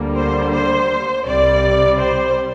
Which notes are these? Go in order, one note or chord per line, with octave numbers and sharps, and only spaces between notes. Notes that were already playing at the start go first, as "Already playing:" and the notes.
Already playing: D2 D3 G3 A#3
C5
C5
C2 C3 G3 D5
C5